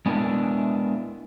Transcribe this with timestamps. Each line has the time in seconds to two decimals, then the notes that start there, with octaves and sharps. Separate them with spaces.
0.06 G#3 B3 D4 E4 A#4